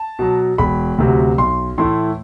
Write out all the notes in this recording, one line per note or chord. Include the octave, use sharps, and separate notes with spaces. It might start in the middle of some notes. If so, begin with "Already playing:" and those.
Already playing: A5
B2 F#3
E1 B5
D2 C3 F#3
B1 C6
A2 E3 A3 E4 C6